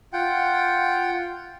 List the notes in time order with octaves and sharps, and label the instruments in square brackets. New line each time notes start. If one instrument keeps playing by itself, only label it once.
[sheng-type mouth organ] F4 F#5 G5